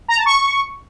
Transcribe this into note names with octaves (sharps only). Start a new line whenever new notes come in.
A#5
A5
C#6